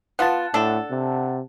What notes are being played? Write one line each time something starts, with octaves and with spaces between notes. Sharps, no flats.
B3 F4 F#5 A5
A2 D4 A4
C3